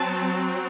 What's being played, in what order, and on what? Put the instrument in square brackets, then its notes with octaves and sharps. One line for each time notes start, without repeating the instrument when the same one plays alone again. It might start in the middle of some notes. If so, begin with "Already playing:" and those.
Already playing: [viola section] F#3 C4 A5